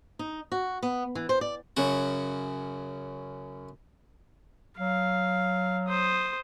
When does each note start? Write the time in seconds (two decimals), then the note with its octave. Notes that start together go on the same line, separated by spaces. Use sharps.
0.19 D#4
0.52 F#4
0.83 B3
1.15 E3
1.29 C5
1.41 D5
1.77 F#2 C#3 F#4
4.78 F#3 F5
5.88 C5 D#6